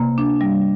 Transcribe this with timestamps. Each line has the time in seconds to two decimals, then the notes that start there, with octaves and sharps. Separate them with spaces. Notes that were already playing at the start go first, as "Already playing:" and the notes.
Already playing: C3 A#3
0.18 D4
0.41 G3